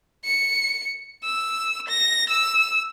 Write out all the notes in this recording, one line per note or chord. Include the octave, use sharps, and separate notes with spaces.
C#7
E6
A#6
E6